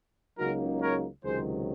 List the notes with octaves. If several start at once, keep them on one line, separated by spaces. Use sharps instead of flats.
C#2 C#3 F#3 A#3 D#4 F#4 A#4
A#4 C#5
C#2 C3 D#3 F#3 G#4 C5